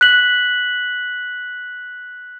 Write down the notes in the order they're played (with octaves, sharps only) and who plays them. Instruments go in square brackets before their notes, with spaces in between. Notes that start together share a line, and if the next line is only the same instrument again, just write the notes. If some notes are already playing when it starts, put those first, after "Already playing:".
[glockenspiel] F#6 B6 F#7